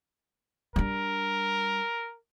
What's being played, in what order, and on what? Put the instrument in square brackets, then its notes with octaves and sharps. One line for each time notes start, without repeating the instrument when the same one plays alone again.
[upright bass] G3 D4 [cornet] A#4